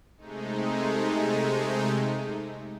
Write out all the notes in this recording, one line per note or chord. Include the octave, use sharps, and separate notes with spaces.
C3 G#3 A3 D#4